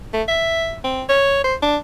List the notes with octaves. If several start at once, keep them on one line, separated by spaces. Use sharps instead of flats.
A3
E5
C4
C#5
C5
D4